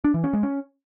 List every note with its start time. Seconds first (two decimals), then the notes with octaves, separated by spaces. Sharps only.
0.04 D4
0.14 E3
0.24 C#4
0.33 G#3
0.43 C#4